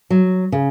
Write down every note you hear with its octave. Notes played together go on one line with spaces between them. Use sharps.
F#3
C#3